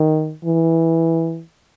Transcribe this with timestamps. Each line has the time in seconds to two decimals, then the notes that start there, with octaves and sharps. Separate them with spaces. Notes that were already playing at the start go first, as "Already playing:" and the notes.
Already playing: D#3
0.45 E3